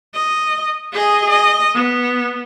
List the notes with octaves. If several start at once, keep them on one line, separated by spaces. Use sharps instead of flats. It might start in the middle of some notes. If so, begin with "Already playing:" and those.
D#5
G#4 D#5
D#5
B3